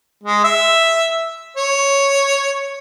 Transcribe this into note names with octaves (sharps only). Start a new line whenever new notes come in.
G#3
E5
C#5